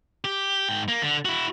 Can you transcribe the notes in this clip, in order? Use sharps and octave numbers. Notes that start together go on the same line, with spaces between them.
G4
G#2 G5
A#3
D3
E4 F#4